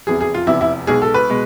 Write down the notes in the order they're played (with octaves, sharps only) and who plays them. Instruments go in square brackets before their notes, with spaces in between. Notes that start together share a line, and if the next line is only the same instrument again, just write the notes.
[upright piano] F1 E2 C3 G#4
G#4
F4
F1 E2 C3 E4
E4
B1 B2 G#3 G#4
A4
B4
B2 G#3